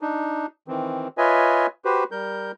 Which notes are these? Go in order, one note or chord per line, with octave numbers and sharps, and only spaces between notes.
D4 D#4
D#3 E3 C4
F4 B4 C#5 D#5 E5 G#5
F#4 G4 B4 C5
G3 A#4 G6